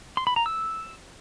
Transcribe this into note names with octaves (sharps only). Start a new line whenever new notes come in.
C6
B5
A#5
E6